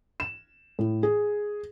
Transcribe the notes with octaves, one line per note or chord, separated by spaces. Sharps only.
E7
A2
G#4